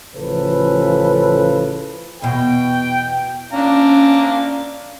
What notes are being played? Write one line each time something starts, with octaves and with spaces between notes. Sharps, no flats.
A1 C#3 F3 A4 B4
E2 B2 G5
C#4 D4 F5 A#5